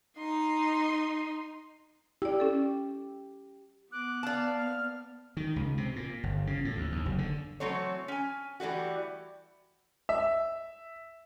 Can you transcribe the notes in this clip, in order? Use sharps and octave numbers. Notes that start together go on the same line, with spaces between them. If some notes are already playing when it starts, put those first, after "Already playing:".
D#4 C6
E4 G4 D5
C#4 A4
B3 D6 F#6
D5 F5 A5
F6
D#3
C#2
C3
A#2
G1
C#3
A2
D2
D#2
F#1
D3
E3 F#3 A3 C4 C#5
C#4 G#5
E3 G3 A3 F#4
E5